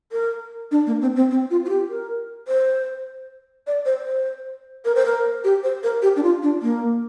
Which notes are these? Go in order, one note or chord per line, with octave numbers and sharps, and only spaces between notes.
A#4
D4
A#3
C4
C4
C4
F4
F4
G4
A#4
C5
D5
C5
C5
A#4
C5
A#4
G4
C5
A#4
G4
D4
F4
D4
A#3